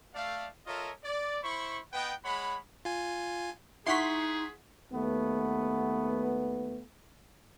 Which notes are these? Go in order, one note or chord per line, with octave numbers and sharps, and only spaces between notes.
A3 D5 F5
F4 A4 A#4 C#5 D#5 E5
D5
E4 C5 B5 C#6
B3 B4 D#5 F#5 G5
G#3 C#5 F#5 B5
F4 G#5
D#4 E4 G#4 F#5 C6 C#6 B6
D#2 A3 B3